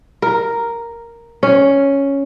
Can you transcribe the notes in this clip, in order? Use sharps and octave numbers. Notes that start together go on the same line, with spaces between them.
A#4
C#4